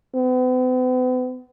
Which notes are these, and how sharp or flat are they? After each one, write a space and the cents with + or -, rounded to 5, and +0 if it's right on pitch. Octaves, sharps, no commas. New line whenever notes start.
B3 +45